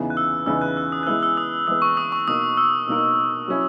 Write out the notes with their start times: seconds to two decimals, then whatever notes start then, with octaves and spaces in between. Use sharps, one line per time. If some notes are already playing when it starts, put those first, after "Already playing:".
Already playing: E2 C#3 E3 B3 D#4
0.10 F#6
0.17 E6
0.46 E2 C#3 E3 B3 D#4 E6
0.62 F#6
0.77 E6
0.92 D#6
1.03 F#6
1.07 E3 G#3 B3 E4 B4 E6
1.23 E6
1.37 D#6
1.67 E3 G#3 B3 E4 B4 D#6
1.82 C#6
1.97 D#6
2.12 C#6
2.27 B2 A#3 D#4 A#4 D#6
2.57 E6
2.87 B2 A#3 D#4 A#4
3.48 F#3 C#4 E4